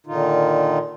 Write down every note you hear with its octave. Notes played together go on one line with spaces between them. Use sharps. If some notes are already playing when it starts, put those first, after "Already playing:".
A#2 D3 D#3 D#4 F4